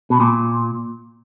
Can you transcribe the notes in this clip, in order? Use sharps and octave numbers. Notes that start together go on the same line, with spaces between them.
B2
A#2